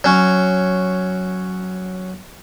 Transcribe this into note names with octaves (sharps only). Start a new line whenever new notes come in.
F#3 C#4